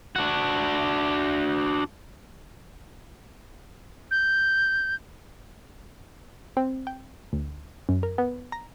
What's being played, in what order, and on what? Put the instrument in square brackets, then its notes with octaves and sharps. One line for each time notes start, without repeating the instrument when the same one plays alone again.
[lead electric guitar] D4 F#4
[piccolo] G6
[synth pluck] C4
G5
D2
F#2
A#4
B3
A#5